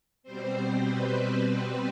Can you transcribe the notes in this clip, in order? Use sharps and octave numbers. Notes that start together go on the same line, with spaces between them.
B2 G3 C4 C5
B4
C5